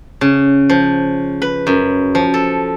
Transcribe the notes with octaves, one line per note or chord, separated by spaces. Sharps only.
C#3
F3
B4
F#2
F3
A4